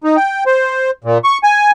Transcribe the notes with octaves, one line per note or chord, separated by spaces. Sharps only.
D#4
G5
C5
A#2
C#6
G#5